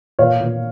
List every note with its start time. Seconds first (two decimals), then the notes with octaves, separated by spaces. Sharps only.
0.19 A#2 C#5 F5
0.40 A#2